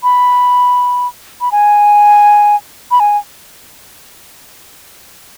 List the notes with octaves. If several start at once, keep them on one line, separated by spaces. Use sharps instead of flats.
B5
B5
G#5
B5
G#5